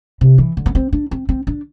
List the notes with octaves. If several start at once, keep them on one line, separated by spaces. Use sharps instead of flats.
C3
E3
D3
B3
C4
D4
C4
C4
D4